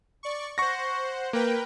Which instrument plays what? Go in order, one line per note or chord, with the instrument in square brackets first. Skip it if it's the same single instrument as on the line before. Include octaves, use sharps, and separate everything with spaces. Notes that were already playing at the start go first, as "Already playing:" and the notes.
[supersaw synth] D5 C#6
[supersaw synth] C5 F#5 [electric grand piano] C#6 A#6
[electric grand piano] A#3 [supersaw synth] A#4 B4 G5